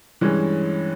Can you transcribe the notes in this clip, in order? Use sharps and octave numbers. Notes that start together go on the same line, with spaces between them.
G2 E3 G#3 C#4